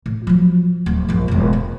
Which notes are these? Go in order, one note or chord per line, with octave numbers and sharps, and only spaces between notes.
A2
F3 F#3
D1
A#1 G2
E1 A1
D3